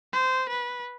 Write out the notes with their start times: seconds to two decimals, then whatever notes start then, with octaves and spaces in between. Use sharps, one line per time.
0.13 C5
0.49 B4